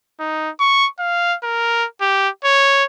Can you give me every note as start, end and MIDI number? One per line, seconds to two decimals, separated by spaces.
0.20 0.50 63
0.60 0.87 85
0.99 1.36 77
1.43 1.86 70
2.01 2.29 67
2.44 2.84 73